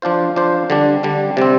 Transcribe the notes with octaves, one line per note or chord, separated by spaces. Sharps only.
F3 D4 F4 C5
F3 D4 F4 C5
D3 G3 D4
D3 G3 D4
C3 G3 C4